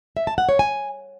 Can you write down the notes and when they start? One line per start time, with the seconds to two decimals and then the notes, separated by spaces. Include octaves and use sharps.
0.17 E5
0.27 A5
0.38 F#5
0.49 C#5
0.59 G#5